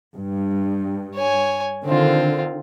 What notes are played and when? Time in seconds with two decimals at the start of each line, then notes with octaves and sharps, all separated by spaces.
0.15 G2
1.15 C#5 G#5
1.86 D3 D#3 C4 F4